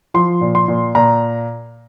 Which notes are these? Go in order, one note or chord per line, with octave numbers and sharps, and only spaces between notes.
F3 C6
A#2
C6
A#2
A#2 A#5